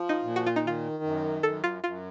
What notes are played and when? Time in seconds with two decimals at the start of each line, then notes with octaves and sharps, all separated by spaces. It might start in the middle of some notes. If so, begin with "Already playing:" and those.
Already playing: F3
0.09 D#4
0.23 A#2
0.36 F#4
0.46 F4
0.56 D#4
0.63 D#3 F4
1.03 F#2
1.43 F#2 A4
1.64 F4
1.84 F#2 F4